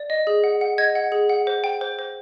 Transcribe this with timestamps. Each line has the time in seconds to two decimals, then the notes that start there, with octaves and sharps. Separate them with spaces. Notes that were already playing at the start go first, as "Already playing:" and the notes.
Already playing: D5
0.10 D#5
0.27 G#4
0.44 F#5
0.61 F#5
0.78 D#5 G#6
0.95 F#5
1.12 G#4
1.29 F#5
1.47 C5
1.64 G5
1.81 C5
1.99 C5